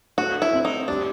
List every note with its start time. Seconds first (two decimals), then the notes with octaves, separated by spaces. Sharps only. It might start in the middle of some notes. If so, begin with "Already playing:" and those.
0.18 A3 F#4
0.42 E4
0.53 C4
0.65 D#4
0.88 G3 D4